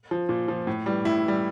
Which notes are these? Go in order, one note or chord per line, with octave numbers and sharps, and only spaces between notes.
F3
A#2
F3
A2
E3 G3
A2 E4
E3 G3